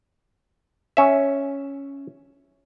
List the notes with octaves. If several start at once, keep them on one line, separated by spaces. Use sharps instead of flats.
C#4 E5